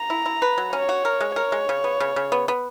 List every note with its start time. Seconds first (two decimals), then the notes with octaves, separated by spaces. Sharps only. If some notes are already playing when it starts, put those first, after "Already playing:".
Already playing: A#5
0.10 E4
0.26 E4
0.42 B4
0.58 F#3
0.73 C#4 C#5
0.89 F#4
1.05 A#4
1.21 G#3
1.36 A#4 C#5
1.52 G#3
1.69 C#3
1.84 B3
2.00 C#3
2.16 C#3
2.32 B3
2.48 B3